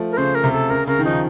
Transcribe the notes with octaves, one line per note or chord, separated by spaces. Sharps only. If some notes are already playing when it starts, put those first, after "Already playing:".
Already playing: F3 A3
A#4
C#3 C5
A#4
C3
A4
C#3 A#4
C#3 A#4
D#3
F3 D#4